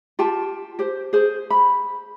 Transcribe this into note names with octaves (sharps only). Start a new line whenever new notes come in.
F4 G4 G5 A5
G4 C5
G#4 C5
B5